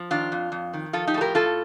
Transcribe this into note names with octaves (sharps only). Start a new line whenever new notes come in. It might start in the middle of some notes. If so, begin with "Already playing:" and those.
Already playing: F3
D#3 D4 F4
F2
F2
D#3
F3 F4 A4
D#4 G4
A2 A4
G4 A#4
A2 F4 A4